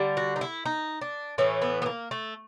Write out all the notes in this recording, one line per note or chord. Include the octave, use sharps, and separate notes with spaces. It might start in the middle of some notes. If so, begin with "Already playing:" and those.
Already playing: D3 G3
F#4
D#4
E4
D#4
D4
A2 E3 A3 C#4
B3
B3
A#3
A3